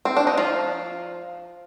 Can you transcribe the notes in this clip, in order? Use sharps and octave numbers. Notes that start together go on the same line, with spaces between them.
C4
D4
D#4
F3 F4